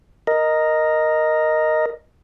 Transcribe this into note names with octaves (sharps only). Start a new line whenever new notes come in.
A#4 D#5